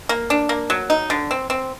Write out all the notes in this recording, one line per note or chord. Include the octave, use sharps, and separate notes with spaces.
A#3
D4
A#3
F#3
D#4
D3
C4
C4